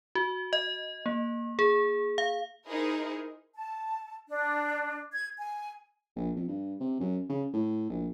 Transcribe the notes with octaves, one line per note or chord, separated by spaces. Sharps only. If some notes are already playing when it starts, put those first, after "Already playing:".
F#4
D#5
A#3
G#4
F5
D#4 E4 G#4 A#4 C5
A5
D4
G#6
G#5
A#1
F2
G2
C3
F#2
C#3
A2
A#1